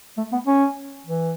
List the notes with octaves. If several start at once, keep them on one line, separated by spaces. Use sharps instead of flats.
A3
B3
C#4
E3